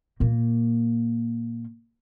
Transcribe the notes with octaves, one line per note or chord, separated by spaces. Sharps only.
A#2 A#3